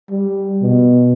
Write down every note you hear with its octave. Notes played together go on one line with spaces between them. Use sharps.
G3
B2